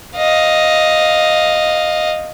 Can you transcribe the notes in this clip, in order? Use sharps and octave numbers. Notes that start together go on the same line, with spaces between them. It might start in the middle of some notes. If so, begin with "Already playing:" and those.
D#5 F5